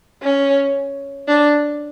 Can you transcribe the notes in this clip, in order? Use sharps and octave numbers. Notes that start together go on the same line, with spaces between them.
C#4
D4